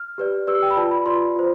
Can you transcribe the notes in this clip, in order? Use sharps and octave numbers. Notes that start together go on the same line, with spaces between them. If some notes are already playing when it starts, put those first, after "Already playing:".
Already playing: F6
G4 B4 D5
G4 B4 D5 E6
G5
B5
F4 B4 D5 A5
B5
F4 B4 D5 C6
F4 C5